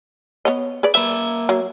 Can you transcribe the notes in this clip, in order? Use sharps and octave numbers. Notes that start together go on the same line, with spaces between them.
B3 C#5 D#5
G#4 B4 D5
A#3 B4 E5
F#3